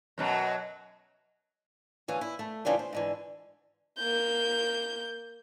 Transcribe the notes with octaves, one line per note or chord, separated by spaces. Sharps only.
F#2 B2 F#3
D2 E3 C#4 F5
E4
A3
G#2 C#3 E3 G3 D4 F4
C5
G#2 D3 E3
A#3 G6